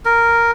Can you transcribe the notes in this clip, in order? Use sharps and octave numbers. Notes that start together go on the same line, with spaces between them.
A#4